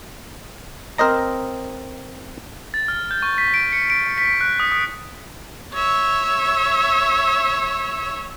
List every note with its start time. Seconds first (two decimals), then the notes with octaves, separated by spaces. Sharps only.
0.98 C4 A#4 C5 D#5 A#5
2.74 A6
2.88 F6
3.11 G6
3.22 C#6
3.38 B6
3.54 D7
3.72 C#7
3.90 D7
4.18 B6
4.41 F#6
4.60 D#6
4.72 D#6
5.74 C#5 E5